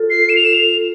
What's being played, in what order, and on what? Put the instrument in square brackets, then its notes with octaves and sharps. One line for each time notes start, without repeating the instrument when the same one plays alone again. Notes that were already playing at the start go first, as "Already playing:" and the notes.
Already playing: [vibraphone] F4 A4
[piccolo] C7
E7
F7
E7
F7